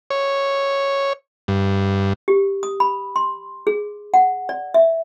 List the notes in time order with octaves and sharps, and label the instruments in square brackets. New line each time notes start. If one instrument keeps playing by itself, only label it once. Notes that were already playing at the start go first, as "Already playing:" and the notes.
[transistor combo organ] C#5
G2
[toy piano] G4
D#6
B5
C6
G#4
F#5
D5
E5